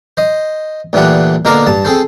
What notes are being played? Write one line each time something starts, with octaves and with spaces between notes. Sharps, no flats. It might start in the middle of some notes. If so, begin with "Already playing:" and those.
C5 D#5
D2 A#2 E3 G3 D4 F#5
B2 D3 A#3 A#4 D5 A#5
G2 A5
C4 G#4 A4 C5